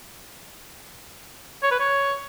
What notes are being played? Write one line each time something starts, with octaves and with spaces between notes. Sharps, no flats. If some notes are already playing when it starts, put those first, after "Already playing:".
C#5
B4
C#5